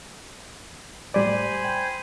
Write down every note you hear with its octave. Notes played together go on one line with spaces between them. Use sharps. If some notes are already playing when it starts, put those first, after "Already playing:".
A2 G3 C5 D5 G#5 B5
G5